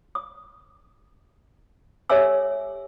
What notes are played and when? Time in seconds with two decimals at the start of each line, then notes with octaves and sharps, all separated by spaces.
0.15 D#6
2.10 G4 A4 C#5 E5 G#5 E6